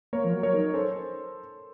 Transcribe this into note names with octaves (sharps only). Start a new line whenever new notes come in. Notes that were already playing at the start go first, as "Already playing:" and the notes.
A#3 A#4 C#5
F3
F#3
A#4 C#5
D#4
C#4 A4 C5